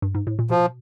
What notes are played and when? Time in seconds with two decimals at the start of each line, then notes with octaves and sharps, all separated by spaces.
0.02 G2
0.15 G#2
0.27 A2
0.39 A#2
0.50 B2 F3